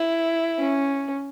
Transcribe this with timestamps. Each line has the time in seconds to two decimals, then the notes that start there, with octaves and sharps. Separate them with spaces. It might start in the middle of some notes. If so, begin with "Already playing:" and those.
Already playing: E4
0.58 C#4